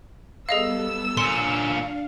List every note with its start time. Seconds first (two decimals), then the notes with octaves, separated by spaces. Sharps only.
0.49 G3 B3 G#4 A4 D#5 F5 E6
1.17 A#2 C#4 D4 F5 C6